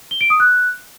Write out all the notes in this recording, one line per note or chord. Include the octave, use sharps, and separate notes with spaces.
G7
D7
D#6
F#6